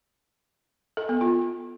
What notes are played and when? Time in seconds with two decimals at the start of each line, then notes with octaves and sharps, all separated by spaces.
0.97 A4
1.09 B3
1.21 F4